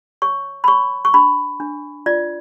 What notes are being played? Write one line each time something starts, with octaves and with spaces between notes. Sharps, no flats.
C#5 C#6
B5
C#5 C#6
C#6
D4 B5
D4
F4 D5